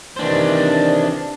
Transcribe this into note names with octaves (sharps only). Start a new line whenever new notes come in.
C3 D#3 E3 D4 C5